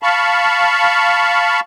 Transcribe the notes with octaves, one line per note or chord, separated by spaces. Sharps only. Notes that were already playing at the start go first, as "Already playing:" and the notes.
F5 A5 B5 C#6